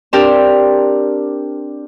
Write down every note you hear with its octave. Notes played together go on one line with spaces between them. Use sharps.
C4 D4 G4 A#4